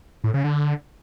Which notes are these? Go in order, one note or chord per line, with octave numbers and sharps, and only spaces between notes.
A2
C#3
D3